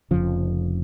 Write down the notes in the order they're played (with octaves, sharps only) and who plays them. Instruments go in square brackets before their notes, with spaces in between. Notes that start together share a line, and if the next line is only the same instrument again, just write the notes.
[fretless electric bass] F1 F2 C#3 F3